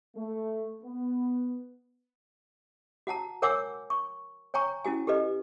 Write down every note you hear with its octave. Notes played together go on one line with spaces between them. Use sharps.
A3
B3
F#4 F#5 A5 A#5
A#4 C#5 F#5 G#5 D6 E6
C#6
C#5 G5 G#5 A#5 C#6
C#4 E4 F#4 G#5
G4 A4 B4 D#5